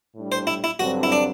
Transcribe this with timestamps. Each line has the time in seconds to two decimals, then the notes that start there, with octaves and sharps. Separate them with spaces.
0.15 A2 G3 D4
0.32 C5
0.47 E4
0.64 E4
0.79 G2 D3 F#3 C4 F#4
1.03 E4
1.12 D4